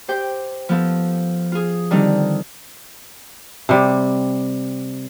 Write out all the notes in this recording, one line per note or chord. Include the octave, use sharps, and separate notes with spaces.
G4 C5 G5
F3 B3 A4
F4 G#4
D3 D#3 G3 C4 D#4
C3 G3